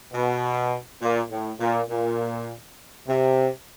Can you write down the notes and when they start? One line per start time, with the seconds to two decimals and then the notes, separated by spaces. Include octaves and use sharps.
0.14 B2
1.01 A#2
1.31 A2
1.60 A#2
1.90 A#2
3.08 C3